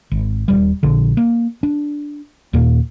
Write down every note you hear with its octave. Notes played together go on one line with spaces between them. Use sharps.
G#1
D#1 G3
A#1 D3
A#3
D4
D#2 A#2 A#3